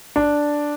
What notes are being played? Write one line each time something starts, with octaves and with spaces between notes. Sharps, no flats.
D4